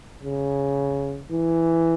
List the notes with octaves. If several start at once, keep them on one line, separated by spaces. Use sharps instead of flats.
C#3
E3